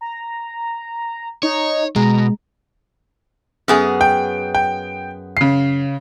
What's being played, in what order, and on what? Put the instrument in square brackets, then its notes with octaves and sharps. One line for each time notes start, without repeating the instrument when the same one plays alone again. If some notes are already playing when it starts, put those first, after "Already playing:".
[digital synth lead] A#5
[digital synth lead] D#4 [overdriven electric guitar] C#5
[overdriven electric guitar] B2 [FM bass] G#3 [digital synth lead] A#5
[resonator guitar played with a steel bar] F#2 B3 G#4
[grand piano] G5
G5
C#3 C7